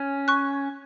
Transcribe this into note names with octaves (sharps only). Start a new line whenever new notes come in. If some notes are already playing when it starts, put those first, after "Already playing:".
Already playing: C#4
C#6 F#6